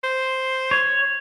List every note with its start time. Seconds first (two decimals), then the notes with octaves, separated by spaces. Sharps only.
0.04 C5
0.71 C#5